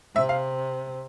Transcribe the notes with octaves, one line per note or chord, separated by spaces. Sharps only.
C3 E5
F5